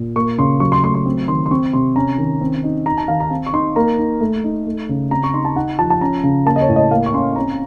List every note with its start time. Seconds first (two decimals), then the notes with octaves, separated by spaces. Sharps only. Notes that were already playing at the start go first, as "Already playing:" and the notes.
Already playing: A#2
0.16 A#3 C#6
0.38 C#3 C6
0.60 F#3 C#6
0.72 C6
0.83 A3 C6
0.94 C6
1.06 C4
1.28 D#3 C6
1.46 C6
1.51 C4 C#6
1.73 C3 C6
1.96 C#4 A#5
2.18 D#3
2.41 C4
2.64 D#4
2.86 D#4 A#5
2.98 A5
3.08 D#3 F5
3.20 A#5
3.30 C4
3.46 C#6
3.53 D#4 C6
3.76 A#3 A#5
3.98 D#4
4.21 A3
4.44 D#4
4.66 A3
4.89 C#3
5.11 C4 A#5
5.24 C#6
5.34 D#4 C6
5.45 A5
5.56 D#4 F#5
5.79 F3 A5
5.90 A5
6.01 C#4 A#5
6.23 C#3
6.46 A#3 A5
6.56 D#5
6.61 C#5
6.69 A2
6.76 D#5
6.91 A#3 F5
7.06 C#6
7.13 C#4 C6
7.36 C4 A#5